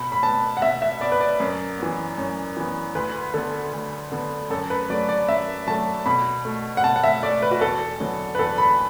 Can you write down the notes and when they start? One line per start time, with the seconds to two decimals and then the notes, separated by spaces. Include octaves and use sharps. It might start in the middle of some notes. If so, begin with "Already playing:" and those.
Already playing: B2 B5
0.12 B5
0.23 B3 A5
0.57 F#5
0.62 B2 E5
0.82 E5
1.01 B3 D5
1.12 B4
1.20 D5
1.40 F#2
1.79 E3 B3
2.18 F#2
2.57 E3 B3
2.95 D2 B4
3.34 D3 B3 A4
3.73 D2
4.12 D3 B3
4.50 F#2 A4
4.70 B4
4.90 F#3 A3 D5
5.09 D5
5.28 F#2 E5
5.68 F#3 A3 A5
6.06 B2 B5
6.45 A3
6.77 F#5
6.84 B2 A5
6.96 F#5
7.04 E5
7.23 A3 D5
7.42 B4
7.51 F#4
7.61 E2 A4
8.00 D3 F#3 B3
8.35 B4
8.39 E2 A4
8.58 B5